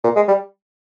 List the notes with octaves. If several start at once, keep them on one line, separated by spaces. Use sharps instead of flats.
A#2
G#3
G3